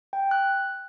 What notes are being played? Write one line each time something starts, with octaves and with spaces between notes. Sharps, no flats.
G5
F#6